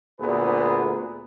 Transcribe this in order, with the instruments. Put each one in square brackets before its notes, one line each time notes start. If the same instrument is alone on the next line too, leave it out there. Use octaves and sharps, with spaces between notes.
[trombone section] D2 A#2 B3 G#4 B4